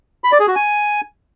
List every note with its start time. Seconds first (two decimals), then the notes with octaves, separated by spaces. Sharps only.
0.24 B5
0.32 D5
0.40 G#4
0.48 F#4
0.55 G#5